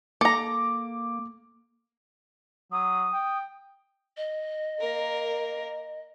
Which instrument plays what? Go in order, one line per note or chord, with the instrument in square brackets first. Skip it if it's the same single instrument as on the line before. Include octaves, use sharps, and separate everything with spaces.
[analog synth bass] A#3 [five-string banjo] A4 A#5 [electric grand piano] D6
[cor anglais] F#3 [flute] D#6
[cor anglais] G5
[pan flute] D#5
[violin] A#3 A#4